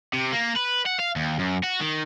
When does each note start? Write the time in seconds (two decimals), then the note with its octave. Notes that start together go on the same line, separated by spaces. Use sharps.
0.13 C3
0.32 A#3
0.56 B4
0.86 F#5
0.99 F5
1.16 D#2
1.39 F#2
1.64 F#4
1.81 D#3